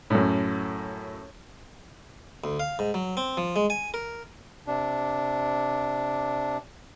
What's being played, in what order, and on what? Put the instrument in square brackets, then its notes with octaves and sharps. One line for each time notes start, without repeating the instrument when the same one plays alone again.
[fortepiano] F#2 A2
[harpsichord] D2
F5
G#2
F#3
C4
F3
G#3
G#5
A#4
[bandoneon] C3 D4